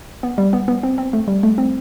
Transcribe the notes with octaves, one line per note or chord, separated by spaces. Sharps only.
B3
G3
B3
B3
C4
C4
A3
G3
A3
C4